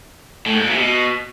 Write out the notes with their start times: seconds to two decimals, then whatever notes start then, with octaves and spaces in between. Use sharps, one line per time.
0.46 A2
0.54 G#2
0.62 A#2
0.70 C3
0.79 B2